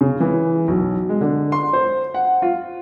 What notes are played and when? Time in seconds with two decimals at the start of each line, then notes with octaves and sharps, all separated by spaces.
0.01 C#3
0.20 E3
0.68 B1
1.09 G#3
1.21 D3
1.52 C6
1.73 C5
2.14 F#5
2.42 F4